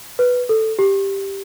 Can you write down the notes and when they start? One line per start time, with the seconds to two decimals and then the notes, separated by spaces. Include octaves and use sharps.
0.19 B4
0.49 A4
0.79 G4